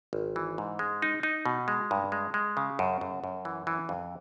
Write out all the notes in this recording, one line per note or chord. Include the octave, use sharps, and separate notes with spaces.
G#1
E3
G#2
G#3
D#4
D#4
B2
G#3
G2
G#3
G#3
C#3
F#2
F#2
F#2
E3
E3
F2